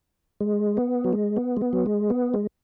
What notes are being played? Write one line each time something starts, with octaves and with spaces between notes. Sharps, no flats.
G#3
B3
F#3
G#3
B3
G#3
B3
F#3
G#3
B3
G#3